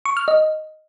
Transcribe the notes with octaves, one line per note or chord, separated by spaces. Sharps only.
C#6
F6
D#5